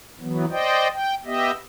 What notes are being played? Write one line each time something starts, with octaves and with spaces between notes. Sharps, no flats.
E3 F#3 B3
C5 D5 D#5 G5
G5
B3 G4 D#5 E5